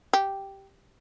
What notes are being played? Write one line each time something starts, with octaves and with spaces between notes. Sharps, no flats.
G4